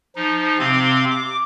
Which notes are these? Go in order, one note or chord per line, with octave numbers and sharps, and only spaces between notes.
F3 D#4
C3 C4 F5 C6
D6